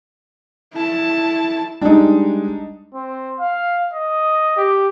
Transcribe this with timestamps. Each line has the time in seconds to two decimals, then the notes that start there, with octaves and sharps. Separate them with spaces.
0.74 E4 A5
1.81 G3 G#3 D4 D#4
2.94 C4
3.40 F5
3.93 D#5
4.57 G4